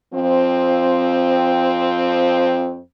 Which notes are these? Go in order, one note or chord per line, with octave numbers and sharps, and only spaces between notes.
F2 F3 C4